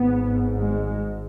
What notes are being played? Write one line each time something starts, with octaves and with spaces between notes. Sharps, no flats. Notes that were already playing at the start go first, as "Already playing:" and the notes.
Already playing: G#1 G#2 B3
G#3